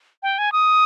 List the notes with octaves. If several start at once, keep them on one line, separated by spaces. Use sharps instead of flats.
G5
G#5
D#6